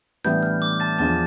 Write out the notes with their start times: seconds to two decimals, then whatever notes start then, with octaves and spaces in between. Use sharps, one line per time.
0.24 A2 E3 G3 B3 D4 G6
0.43 F6
0.62 D6
0.80 A5 A6
0.99 E2 D3 F3 A5 A6